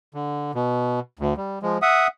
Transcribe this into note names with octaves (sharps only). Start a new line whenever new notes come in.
D3
B2
D2
G3
F3 G#3
E5 F#5 D#6